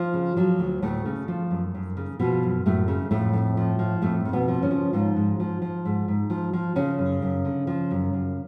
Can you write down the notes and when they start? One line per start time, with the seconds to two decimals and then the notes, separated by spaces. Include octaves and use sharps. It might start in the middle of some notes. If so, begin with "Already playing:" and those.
Already playing: F3 F4
0.14 C#3
0.36 F3 F#3
0.59 D2
0.82 D2 A2 A3
1.06 C#3
1.28 F3
1.51 F#2
1.75 F#2
1.97 C#3
2.20 B2 F3 B3
2.43 F#2
2.66 F#2 A2 A3
2.88 C#3
3.11 F2 A2 A3
3.33 F2
3.57 F3
3.79 F3
4.02 F2 A2 A3
4.25 F2
4.33 B2 B3
4.48 F3
4.62 C#3 C#4
4.71 F3
4.93 G#2 F3 F4
5.16 G#2
5.40 F3
5.62 F3
5.85 G#2
6.08 G#2
6.30 F3
6.53 F3
6.76 C#3 F3 C#4
6.98 F#2
7.22 F#2
7.45 D3
7.67 F3
7.91 F#2
8.13 F#2